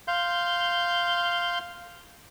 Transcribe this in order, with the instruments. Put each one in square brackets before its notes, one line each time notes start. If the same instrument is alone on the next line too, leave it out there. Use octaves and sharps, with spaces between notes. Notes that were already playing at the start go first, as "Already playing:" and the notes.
[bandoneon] F5 C6 G6